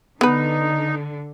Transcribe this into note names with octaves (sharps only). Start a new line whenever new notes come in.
D3 B3 D#4 B4